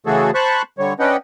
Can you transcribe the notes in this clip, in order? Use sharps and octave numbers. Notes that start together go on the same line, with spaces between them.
C#3 E3 A3 F#4 G#4 A4
C5 A5 B5 C#6 F#6
D3 G3 C#5
C#4 D4 B4 D#5 F#5 G5